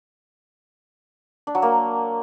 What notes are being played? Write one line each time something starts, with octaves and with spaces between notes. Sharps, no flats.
D4
F#3
A#3